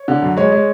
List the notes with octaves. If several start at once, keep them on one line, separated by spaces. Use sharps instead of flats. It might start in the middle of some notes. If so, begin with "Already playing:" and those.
Already playing: C#5
D3
F#2
G#3 C#5
G#3